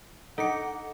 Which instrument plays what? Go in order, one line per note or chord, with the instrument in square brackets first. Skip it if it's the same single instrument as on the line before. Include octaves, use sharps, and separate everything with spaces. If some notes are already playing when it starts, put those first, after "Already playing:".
[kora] D#4 [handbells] A4 C#7 [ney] F#5